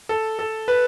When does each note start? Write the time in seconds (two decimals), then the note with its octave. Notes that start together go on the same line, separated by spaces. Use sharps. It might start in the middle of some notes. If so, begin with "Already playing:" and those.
0.09 A4
0.39 A4
0.68 B4